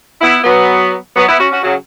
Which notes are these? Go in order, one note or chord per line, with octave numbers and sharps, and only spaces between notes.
B3 E4
F#3 B3
F#3 B3
B3 E4
C#4 F#4
C#4 F#4
C#3 F#3